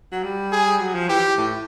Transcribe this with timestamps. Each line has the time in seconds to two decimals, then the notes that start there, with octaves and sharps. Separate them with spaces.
0.12 F#3
0.24 G3
0.52 G#4
0.80 F#3
0.94 F3
1.09 E3 G4
1.38 A2